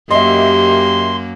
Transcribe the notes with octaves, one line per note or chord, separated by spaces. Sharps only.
F#2 A#3 G4 D#5 E5 C6